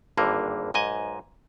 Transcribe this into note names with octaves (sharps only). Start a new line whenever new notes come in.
G#1 G2 D3 A#3
B1 G#2 D#5 G#5